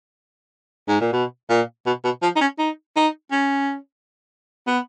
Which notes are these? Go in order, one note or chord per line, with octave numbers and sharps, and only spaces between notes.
G#2
A#2
B2
A#2
B2
B2
F3
D#4
C#4
D#4
D#4
C#4
B3